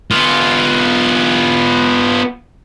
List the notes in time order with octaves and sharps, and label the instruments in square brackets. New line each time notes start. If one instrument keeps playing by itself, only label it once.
[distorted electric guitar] B3 F4